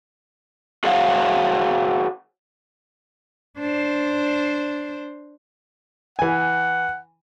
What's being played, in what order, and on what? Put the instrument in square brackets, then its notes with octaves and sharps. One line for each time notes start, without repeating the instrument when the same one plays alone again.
[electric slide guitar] F#4 G#4 C5 C#5 F5 F#5
[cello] D4 C5
[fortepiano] E3 G#5 [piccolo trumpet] F#5